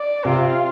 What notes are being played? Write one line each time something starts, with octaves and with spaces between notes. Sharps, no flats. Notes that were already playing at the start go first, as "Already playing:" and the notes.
Already playing: D5
C3 F4